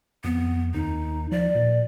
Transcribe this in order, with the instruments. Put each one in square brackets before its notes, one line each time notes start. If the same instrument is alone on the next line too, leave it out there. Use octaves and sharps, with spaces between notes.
[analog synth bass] F2 [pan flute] B3
[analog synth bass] D#2 [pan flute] D#4
[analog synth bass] F3 [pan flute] D5
[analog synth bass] A#2